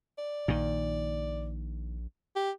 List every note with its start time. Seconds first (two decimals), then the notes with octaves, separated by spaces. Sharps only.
0.18 D5
0.48 A#1 A#2 D#3
2.36 G4